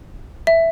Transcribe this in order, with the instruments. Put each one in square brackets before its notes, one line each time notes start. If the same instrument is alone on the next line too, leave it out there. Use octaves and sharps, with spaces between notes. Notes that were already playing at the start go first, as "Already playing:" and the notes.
[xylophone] E5